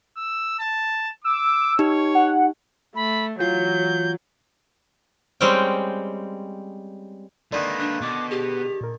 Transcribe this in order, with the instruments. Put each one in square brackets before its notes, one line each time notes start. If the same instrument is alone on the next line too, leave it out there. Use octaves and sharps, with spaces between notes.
[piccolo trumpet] E6
A5
[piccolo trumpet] D6 [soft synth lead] E6
[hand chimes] D#4 G4 [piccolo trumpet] C#5
[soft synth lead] F#5
[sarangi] A3 [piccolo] B5
[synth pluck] E3 F4 [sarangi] F#3 [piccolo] G6
[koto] G3 G#3 C4 C#4 G5
[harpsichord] D3 D#3 [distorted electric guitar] A#3 B4 [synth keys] D5
[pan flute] D4 [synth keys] F#6
[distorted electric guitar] B2 [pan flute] D6
[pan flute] G4 [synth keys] G#4
[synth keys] A#2 A#4